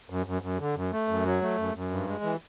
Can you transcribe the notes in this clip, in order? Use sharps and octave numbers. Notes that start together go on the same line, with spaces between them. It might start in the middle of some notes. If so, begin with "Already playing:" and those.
F#2
F#2
F#2
D3
F#2
A3
F#2
F#3
A3
F#2
F#2
G2
G#3
E3